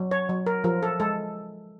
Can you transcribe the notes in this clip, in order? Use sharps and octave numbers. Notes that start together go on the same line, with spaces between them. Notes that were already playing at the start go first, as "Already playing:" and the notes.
Already playing: F#3
C#5
F#3
A#4
F3 A#4
A4
G#3 A4